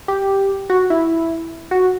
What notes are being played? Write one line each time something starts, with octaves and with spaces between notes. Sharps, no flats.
G4
F#4
E4
F#4